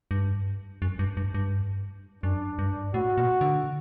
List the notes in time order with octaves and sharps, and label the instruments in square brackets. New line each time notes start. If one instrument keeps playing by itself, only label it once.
[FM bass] G2
F#2
G2
G2
G2
[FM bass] F#2 [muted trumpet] D4
[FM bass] G2
[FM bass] A2 [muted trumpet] F#4
[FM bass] A#2
D3